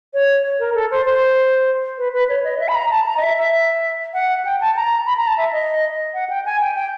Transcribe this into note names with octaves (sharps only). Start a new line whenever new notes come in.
C#5
A#4
A4
C5
C5
B4
B4
C#5
D#5
E5
B5
A#5
A5
A#5
D#5
E5
E5
F#5
G5
A5
A#5
B5
A#5
A5
E5
D#5
F#5
G5
G#5
G5
G5